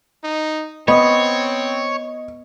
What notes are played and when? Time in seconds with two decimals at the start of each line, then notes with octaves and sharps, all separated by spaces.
0.24 D#4
0.88 B3 C4 C#5 D#5